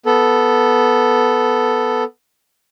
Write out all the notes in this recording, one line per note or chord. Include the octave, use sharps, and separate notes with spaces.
B3 A4